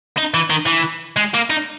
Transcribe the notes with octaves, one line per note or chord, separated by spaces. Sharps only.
D#4
E3
D#3
E3
G#3
A#3
D#4